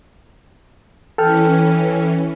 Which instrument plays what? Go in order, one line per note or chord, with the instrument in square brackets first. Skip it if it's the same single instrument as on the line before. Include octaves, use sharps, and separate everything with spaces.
[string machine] E3 C#4 [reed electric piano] A4 G5 F6